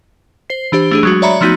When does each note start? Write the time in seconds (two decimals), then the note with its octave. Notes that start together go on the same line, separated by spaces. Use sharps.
0.50 C5 C7
0.72 E3 D4 G4 C5
0.91 A3 D4 G#4
1.03 F#3 G#3 F#4
1.22 C#5 D5 E5 A#5 B5 C#7
1.41 F3 A3 B3 D#4 F#4 G6